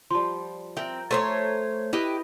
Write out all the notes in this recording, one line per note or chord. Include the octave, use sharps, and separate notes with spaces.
F3 G3 A5 C6
C4 A#4 E5 G5
A3 C5 C#5 A5 A#5
E4 G4 B4 D#5